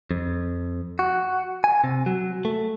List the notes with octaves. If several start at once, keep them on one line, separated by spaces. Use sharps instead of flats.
F2
F#4
G#5
C3
F#3
A3